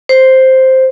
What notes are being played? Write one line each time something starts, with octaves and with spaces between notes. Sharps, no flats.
C5